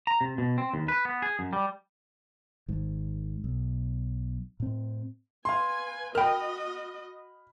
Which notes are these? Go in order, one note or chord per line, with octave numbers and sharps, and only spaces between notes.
A#5
C3
B2
C4
D#2
B4
B3
G#4
F#2
G3
G#1 G#2
B1
A2 C4
B4 F5 G#5 C6
F#4 A#4 D#5 G5 B5 F6